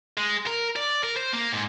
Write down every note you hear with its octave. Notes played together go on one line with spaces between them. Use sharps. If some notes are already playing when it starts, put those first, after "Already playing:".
G#3
A#4
D5
A#4
C5
A#3
G#2